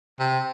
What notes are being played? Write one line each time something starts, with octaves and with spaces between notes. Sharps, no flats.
C3